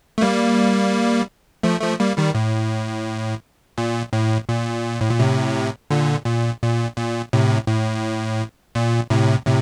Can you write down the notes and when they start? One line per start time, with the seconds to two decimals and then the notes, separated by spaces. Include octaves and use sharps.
0.18 A3
0.21 G3 A#3
1.63 F3 A3
1.81 F3 A3
2.00 G3 A#3
2.18 D#3 G3
2.35 A2
3.78 A#2
4.13 A2
4.49 A#2
5.01 A2
5.10 A#2
5.19 A2 C3
5.90 A#2 D3
6.26 A#2
6.62 A#2
6.97 A#2
7.33 A2 C3
7.68 A2
8.75 A#2
9.10 A2 C3
9.46 A2 C3